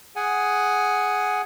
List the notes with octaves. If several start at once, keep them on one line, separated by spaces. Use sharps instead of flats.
G#4 F#5 G#5